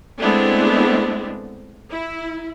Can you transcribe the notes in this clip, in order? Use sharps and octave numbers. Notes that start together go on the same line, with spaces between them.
G#3 A3 B3 C4 D4 E4
E4